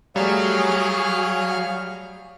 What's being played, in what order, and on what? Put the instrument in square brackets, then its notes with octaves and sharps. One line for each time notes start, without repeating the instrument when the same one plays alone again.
[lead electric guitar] F#3 [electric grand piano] G3 A3 [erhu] G#4 [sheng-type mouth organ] C#5 F5 F6